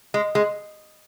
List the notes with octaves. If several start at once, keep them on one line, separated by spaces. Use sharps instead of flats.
G#3
G#3